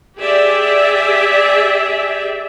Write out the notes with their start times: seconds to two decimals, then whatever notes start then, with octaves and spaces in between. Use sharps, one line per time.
0.19 G4 G#4 D5 E5